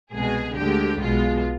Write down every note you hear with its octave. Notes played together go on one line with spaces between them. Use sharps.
C2 B2 G#3 G#4
D2 D3 G#3 G4
B1 B2 G#3 F4